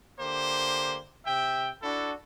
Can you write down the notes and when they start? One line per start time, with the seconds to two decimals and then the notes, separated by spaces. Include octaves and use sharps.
0.19 D3 A#3 G4 C5
1.26 C3 E5 G5
1.83 D4 E4 F#4 A4